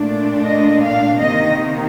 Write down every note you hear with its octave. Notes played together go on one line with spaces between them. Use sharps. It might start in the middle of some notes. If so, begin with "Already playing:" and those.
Already playing: A#2 A3 D4
D#5
F5
C3 D#3 A#3 D#5